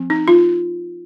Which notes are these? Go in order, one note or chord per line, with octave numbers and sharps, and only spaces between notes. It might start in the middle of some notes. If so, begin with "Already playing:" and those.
Already playing: F3 C4
D#4
F4